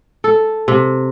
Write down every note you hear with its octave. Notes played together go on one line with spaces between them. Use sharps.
A4
C3